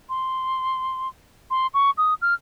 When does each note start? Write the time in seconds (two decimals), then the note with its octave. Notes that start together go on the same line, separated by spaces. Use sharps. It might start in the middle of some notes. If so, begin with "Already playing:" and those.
0.09 C6
1.50 C6
1.74 C#6
1.98 D#6
2.22 F6